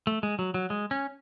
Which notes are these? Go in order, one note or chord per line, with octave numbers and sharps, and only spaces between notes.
A3
G#3
F#3
F#3
G#3
C#4